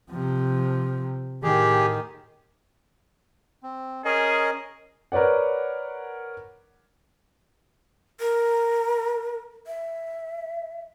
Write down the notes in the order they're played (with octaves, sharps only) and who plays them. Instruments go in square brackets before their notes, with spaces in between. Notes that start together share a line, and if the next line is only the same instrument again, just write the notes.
[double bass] C3 F3
[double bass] A2 D#3 [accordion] G4 G#4
[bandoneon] C4
[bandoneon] C#4 A#4 D#5 [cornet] G#4
[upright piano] A#4 B4 C#5 D5 F#5
[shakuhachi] A#4
E5